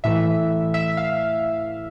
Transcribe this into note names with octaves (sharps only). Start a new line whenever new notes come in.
A2 E3 E5
E5
F5